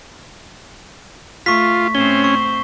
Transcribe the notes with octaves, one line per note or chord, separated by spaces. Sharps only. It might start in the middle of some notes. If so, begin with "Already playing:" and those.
A3 F4 C#6 B6
A2 C4 C#4 C5 G7
C#6